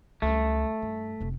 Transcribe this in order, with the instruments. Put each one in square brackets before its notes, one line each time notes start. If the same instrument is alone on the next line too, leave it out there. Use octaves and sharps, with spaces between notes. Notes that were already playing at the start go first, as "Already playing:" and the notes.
[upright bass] C#2 G3 [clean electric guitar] A3
[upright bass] G2
F1 C3